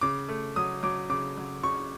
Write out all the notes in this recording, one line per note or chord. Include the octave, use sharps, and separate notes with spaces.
C#3 D6
A3
F#3 D#6
F#3 D6
C#3 D6
F#3
C#3 C#6